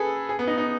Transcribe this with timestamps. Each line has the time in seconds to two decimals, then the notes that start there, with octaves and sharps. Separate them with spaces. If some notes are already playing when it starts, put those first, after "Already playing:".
Already playing: G#4 A4 B4
0.29 G#4
0.39 B3
0.47 D#4
0.58 D#4